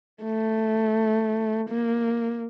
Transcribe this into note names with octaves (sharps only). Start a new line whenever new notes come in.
A3
A#3